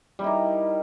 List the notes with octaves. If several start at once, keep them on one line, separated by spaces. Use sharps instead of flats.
G3 D#4 E4 A#4